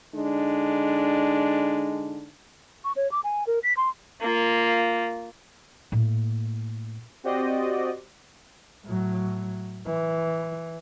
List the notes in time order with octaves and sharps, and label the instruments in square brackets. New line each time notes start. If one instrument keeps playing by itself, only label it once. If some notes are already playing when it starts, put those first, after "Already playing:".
[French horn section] D3 G#3 D4 D#4
[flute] C#6
C#5
D6
G#5
A#4
B6
C6
[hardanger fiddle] A#3 F4
[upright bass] A2 A#3
[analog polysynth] C4 F#4 G4 C5 D5 D#5
[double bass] A2 F#3
E3